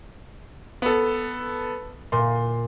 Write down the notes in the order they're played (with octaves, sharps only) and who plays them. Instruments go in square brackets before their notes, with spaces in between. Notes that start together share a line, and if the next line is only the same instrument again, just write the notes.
[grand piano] B3 A4
[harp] A#2 [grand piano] C6